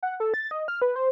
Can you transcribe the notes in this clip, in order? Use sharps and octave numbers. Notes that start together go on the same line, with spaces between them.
F#5
A4
A6
D#5
F6
B4
C5